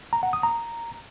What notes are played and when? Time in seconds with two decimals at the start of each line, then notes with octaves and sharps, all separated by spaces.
0.13 A#5
0.23 F#5
0.33 D#6
0.43 A#5